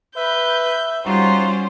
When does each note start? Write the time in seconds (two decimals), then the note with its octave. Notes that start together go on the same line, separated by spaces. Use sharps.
0.16 B4 E5 G6
1.05 G3 C#4 D#4 F4 F#4 C5